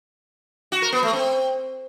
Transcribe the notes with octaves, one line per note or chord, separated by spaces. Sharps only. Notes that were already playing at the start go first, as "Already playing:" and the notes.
F#4
A#4
B3
A3
C4